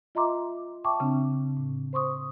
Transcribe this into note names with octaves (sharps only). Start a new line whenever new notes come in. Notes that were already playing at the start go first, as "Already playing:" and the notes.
F4 D#5 E5 A#5 C6 D6
E5 G5 A5 C#6 D6
C#3 C4 D4
A2
C5 C6 C#6 D#6